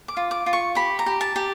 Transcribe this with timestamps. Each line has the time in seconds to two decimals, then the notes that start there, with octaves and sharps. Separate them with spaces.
0.08 D6
0.17 F4
0.31 D6
0.46 F4
0.53 C#6
0.75 G4 B5
0.99 A#5
1.06 G4
1.21 A5
1.36 G4